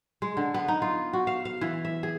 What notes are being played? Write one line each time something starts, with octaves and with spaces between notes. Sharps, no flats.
G#3
D3
B3
D#4
F4
F#4
F5
F5
E3
E5
G#4